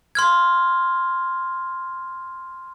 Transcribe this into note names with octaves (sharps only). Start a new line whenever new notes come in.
C6 F6 G#6